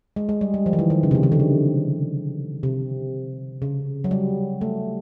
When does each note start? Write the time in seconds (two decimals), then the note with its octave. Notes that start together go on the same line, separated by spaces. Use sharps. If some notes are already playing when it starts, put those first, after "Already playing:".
0.16 G#3
0.29 G#3
0.41 G3
0.54 G3
0.66 F3
0.73 D#3
0.79 E3
0.90 D#3
1.03 C#3
1.11 C3
1.15 C#3
1.23 D#3
1.32 D3
1.40 C#3
2.63 C3
3.62 C#3
4.04 F#3
4.11 G3
4.61 A3